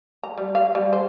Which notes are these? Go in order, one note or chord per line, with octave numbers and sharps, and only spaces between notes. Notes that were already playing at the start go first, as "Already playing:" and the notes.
A#5
G3
F5
G3
C5